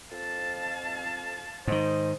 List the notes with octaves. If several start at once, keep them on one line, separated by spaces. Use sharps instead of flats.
F2 F5 A5
G#2 D#3 C5 D#5